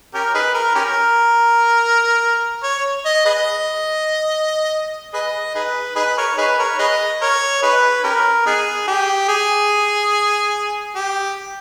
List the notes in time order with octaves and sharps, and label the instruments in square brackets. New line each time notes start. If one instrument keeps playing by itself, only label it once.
[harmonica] C#4 G4 A#4
D#4 G#4 B4
A#4
C#4 G4 A#4
C#5
D#5
G#4 B4 D#5
G#4 B4 D#5
D#4 G#4 B4
D#4 G#4 B4
A#4 C#5
D#4 G#4 B4
A#4 C#5
G#4 B4 D#5
A#4 C#5
D#4 G#4 B4
C#4 G4 A#4
B3 D#4 G#4
G4
G#4
G4